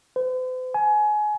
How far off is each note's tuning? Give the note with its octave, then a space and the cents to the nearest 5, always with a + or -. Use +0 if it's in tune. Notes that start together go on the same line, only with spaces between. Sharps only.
C5 -45
G#5 +25